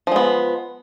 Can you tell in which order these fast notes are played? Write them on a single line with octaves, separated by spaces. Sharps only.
F3 G#3 B3